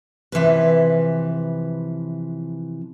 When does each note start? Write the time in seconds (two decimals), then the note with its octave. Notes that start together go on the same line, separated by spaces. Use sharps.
0.32 C3 E3 F3 B4